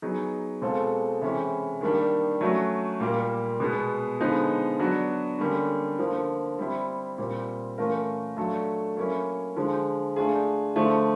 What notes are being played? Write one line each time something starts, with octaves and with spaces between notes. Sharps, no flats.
F#3 B3 D#4 G#4
B2 G#3 C4 F4 A4
C3 E3 G#3 C#4 E4
D#3 G3 A#3 D4
F#3 A3 C#4 F#4
A#2 G3 A#3
B2 G#3 B3
D3 F3 G#3 B3 D#4
F#3 B3 D4 F#4
D3 G3 A#3 C#4
D3 F3 A#3
G3 C4 E4
A#2 G3 C4
E3 A3 C#4 F4 A#4
F#3 A3 D4 F4 A4
F#3 A#3 C#4 E4
D3 F3 G#3
A3 D4 F4 G#4
D3 F3 A3